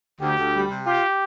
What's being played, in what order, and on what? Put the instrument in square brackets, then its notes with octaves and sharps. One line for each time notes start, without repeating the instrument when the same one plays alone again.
[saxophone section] D2 [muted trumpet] G4
[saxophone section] D2
G3
C3
[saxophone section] F4 [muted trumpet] G4